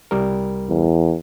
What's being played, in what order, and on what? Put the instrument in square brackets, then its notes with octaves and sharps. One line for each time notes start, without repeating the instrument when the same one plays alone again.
[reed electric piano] C2 G3 A#4
[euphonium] E2